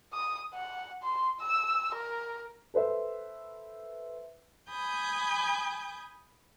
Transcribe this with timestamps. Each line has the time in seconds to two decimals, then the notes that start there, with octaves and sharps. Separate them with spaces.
0.13 D#6
0.54 F#5
1.03 C6
1.40 E6
1.95 A#4
2.74 A4 B4 C5 E5
4.69 G#5 B5 D#6 G6